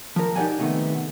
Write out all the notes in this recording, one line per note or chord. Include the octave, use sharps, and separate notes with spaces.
F3 A#4
D#4 G4 A4 D5 F#5 G#5
C3 D#3 A3 B3